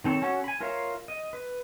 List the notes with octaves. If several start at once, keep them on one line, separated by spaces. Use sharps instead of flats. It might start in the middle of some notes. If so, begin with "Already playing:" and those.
D#3 C4 A4 C#5
C#4 F#4 A4
G#5 B5
F4 A#4 C#5 E5 F5
D#5
B4